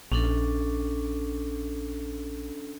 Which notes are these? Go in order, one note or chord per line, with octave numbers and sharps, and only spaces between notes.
A#1 C#4 D4 A4